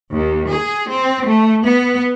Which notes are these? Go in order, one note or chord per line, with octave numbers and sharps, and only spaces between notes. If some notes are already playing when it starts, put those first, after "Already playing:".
D#2
G#4
C4
A3
B3